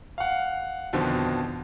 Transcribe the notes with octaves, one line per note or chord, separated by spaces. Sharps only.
F5 F#5
F2 B2 D3 D#3 F3